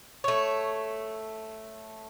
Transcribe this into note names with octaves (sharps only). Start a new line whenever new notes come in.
A3 C#5